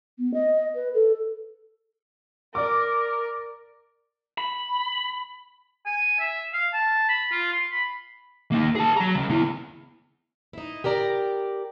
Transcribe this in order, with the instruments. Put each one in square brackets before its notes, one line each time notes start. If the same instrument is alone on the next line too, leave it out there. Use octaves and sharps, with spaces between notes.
[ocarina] B3
D#5
B4
A4
[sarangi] A#4 [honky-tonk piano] D5 D6
[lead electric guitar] B5
[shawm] G#5
E5
F5
A5
B5
F4
C6
B5
[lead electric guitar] A#3 D#4
G#4 A5
F#3 A#5
C#2
B3 E4
[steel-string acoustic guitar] D#4 E4
G4 A#4 D5 A#5